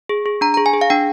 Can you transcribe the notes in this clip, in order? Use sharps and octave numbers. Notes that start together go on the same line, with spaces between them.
G#4
G#4
D4 A#5
G#4 A#5
G#5
G#4
F5
D4 G5